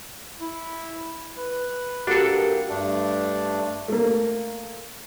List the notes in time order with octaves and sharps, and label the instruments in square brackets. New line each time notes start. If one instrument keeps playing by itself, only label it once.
[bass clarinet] E4
B4
[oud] A#3 F#4 G4 [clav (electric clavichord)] D4 A4
[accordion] G2 A3 D4
[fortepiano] A3 A#3